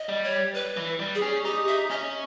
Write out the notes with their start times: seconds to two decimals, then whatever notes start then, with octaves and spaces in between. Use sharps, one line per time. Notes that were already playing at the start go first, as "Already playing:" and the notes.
Already playing: D#5
0.09 G3
0.24 C#5
0.54 B4
0.77 E3
0.99 G3
1.15 G#4
1.22 C#4
1.45 D#4 G4
1.67 E5
1.90 C#4 D#5